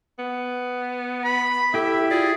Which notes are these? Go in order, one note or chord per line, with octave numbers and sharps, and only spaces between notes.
B3
B5
E4 G4 A4 E5
F4 G#4 D5